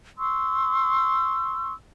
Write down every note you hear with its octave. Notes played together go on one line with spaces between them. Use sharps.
C6 C#6 E6